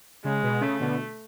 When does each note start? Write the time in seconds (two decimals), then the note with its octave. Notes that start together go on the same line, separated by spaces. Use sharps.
0.24 C#3 G#3
0.43 B2
0.61 C#3 A3
0.80 B2 D3